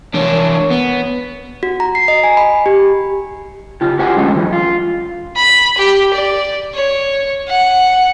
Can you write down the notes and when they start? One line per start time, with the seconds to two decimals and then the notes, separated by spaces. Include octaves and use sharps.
0.14 E2 D4 A#4 C#5
0.71 B3
1.63 F#4
1.80 A#5
1.95 C7
2.08 D#5
2.23 G#5
2.37 B5
2.66 G4
3.81 C#3 F4 G4
3.99 F#4 G4 C5 F#5 G#5
4.17 A2 D3 G#3 C#4 D#4 F4
4.36 F#2 E3
4.53 F4
5.36 B5
5.77 G4
6.13 D5
6.74 C#5
7.48 F#5